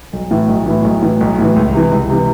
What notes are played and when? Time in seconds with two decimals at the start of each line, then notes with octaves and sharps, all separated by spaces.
0.13 B1
0.31 A2 E3
0.48 B1
0.66 A2 E3
0.84 B1
1.02 A2 E3
1.21 B1
1.38 A2 E3
1.56 C#2
1.74 C3 E3
1.91 C#2
2.10 C3 E3